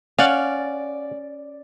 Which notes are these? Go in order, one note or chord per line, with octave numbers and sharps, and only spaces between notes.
C#4 D5 F5 F#5